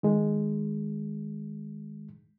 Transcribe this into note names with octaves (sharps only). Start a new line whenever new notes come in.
D#3 G#3